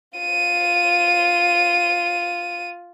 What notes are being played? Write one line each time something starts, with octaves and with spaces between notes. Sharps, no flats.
F4 D#7